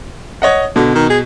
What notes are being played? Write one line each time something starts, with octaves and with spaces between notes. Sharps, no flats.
C#5 D#5 F#5
B2 D3
D#3
G#4